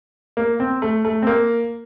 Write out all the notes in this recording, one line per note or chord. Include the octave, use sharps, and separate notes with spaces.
A#3
C4
A3
A3
C4
A#3